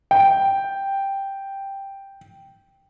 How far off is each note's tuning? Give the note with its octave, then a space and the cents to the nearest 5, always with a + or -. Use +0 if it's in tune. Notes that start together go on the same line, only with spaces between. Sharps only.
G5 +0